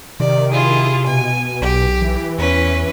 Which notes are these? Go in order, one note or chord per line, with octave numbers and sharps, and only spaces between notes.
C3 D#3 D5
E4 F4 G#4
B2 G#5
B1 G4
E3
E2 C#4 B4